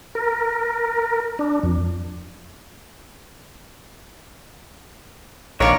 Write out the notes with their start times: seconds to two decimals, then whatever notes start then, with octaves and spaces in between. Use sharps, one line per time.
0.15 A#4
1.39 D4
1.63 F2
5.60 A#1 D#3 A#3 D4 F4 A#4 C#5 D5